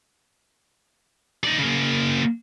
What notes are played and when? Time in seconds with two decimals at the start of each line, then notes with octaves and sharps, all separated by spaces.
1.44 D#4 D5
1.58 C#3 A#3